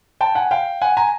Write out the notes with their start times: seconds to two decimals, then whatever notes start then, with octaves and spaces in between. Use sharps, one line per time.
0.21 G5 A5
0.35 F#5 G#5
0.51 F5 G5
0.81 F#5 G#5
0.97 G#5 A#5